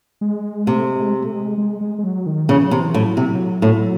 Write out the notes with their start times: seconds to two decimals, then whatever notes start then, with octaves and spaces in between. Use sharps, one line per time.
0.21 G#3
0.67 C3 A3
0.89 G#3
1.24 A3
1.35 G#3
1.58 G#3
1.81 G#3
1.99 G#3
2.04 F#3
2.26 D#3
2.48 C#3 E3
2.66 F#3
2.71 C3 E3
2.94 A2 F#3
3.17 C3 F#3
3.62 A2